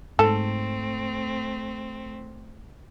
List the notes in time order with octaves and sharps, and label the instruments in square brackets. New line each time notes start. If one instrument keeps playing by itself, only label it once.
[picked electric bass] G#2 [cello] A3 C4 [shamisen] A4